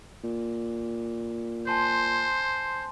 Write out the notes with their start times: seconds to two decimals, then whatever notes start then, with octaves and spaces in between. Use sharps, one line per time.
0.24 A#2
1.68 C5 G#5 A5 C6